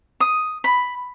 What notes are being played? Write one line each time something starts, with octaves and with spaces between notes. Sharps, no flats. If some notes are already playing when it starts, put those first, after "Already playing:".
D#6
B5